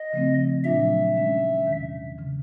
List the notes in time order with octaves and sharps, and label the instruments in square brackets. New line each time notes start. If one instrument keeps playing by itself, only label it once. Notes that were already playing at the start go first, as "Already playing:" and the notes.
Already playing: [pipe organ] D#5
[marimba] C#3 F3 A3 C4
[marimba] A#2 F#3 A3 D4 F4 [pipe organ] E5
[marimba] D#3 G#3 C#4
E2 C3 D#3
C#3 E3